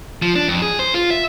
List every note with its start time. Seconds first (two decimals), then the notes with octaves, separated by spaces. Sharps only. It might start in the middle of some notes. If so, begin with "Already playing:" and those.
0.22 F3
0.36 D4
0.48 F2
0.62 G#4
0.79 C5
0.94 F4
1.10 E5